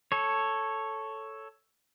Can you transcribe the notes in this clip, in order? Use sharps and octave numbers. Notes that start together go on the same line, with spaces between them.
A4 C#5